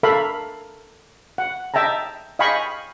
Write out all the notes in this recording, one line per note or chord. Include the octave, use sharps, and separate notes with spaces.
A4 A#4 E5 F5 B5
F#5
D#5 E5 G5 A5 A#5
D#5 F5 G5 G#5 B5 C#6